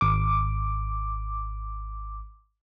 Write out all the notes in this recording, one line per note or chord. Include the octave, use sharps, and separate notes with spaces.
G#1 D6